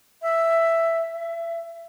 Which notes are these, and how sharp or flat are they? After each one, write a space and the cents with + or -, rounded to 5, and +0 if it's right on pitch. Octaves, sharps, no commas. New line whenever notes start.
E5 +5
E5 +30